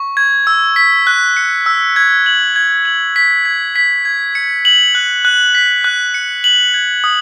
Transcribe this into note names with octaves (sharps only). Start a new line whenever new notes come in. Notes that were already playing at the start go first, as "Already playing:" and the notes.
Already playing: C#6
G#6
E6
B6
F#6
C#7
E6
G#6
F#7
G#6
F#7
B6
G#6
B6
G#6
C#7
F#7
F#6
F#6
B6
F#6
C#7
F#7
G#6
D#6